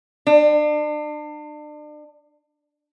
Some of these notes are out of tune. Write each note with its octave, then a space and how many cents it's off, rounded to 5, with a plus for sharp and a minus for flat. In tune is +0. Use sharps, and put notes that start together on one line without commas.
D4 +35